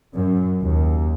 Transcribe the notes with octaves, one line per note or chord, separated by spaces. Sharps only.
F#2
D#2